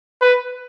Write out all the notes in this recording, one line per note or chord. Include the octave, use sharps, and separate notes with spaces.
B4